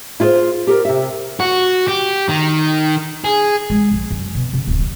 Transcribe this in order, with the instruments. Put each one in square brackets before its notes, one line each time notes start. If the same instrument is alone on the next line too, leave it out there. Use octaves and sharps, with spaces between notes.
[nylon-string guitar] E4 F4 G#4 C5 F5
G4 A4 A#4
C3 E5
[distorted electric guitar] F#4
G4
D#3
G#4
[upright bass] G#3
A#1
F#2
B2
C#3
D1
G3